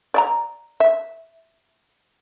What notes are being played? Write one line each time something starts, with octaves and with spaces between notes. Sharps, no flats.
D5 E5 A#5
E5